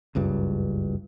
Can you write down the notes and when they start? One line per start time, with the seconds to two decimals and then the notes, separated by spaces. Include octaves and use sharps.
0.15 F#1 C#2 G2